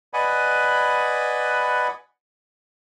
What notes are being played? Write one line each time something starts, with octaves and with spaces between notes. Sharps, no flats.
B4 D5 D#5 F#5 G#5 B5